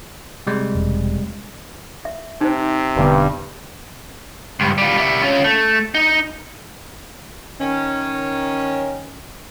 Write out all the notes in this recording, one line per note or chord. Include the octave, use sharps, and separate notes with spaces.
C3 G3 G#3
E1
E5
C3 D#4 C5
E1 G2 D3 B3
C#2 G2
G3 F4
G3 E5
C#4 F4
A3
D#4
D#3 C#4